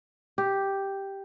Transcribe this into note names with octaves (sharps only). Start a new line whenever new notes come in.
G4